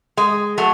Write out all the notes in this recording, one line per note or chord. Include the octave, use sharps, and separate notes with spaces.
G#3
F#3 A3